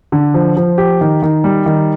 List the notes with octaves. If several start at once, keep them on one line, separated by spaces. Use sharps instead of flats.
D3
F3
F3
G4
D#3
D#3
G3
D#3